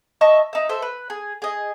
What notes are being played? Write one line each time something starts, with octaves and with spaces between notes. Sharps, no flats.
D#5 E5 A5 C#6
D#4 E5
A4 C5 E5
B4
G#4
G#4 D#5